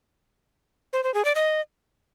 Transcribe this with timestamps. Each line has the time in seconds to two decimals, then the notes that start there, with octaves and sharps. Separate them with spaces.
0.93 C5
1.04 C5
1.14 G#4
1.25 D5
1.35 D#5